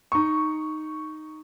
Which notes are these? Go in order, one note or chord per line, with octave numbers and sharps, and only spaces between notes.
D#4 C#6